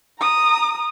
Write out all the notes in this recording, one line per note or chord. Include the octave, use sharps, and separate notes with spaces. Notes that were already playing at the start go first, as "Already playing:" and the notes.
A#5 D#6